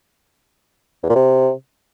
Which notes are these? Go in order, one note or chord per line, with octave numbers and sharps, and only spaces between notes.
E2
A#2
C3